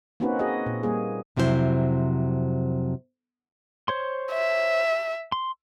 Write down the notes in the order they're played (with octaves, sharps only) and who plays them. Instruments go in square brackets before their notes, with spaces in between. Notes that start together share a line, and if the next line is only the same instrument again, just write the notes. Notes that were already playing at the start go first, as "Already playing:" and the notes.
[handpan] A#3 C4 C#4 D#4 F#4 B4
F#4 G#4 D#5
A#2
G3 A#3 G#4
[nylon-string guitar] F2 C3 F#3 E4 G4 C5
[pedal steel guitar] C5 C#5 C6
[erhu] E5
[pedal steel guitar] C6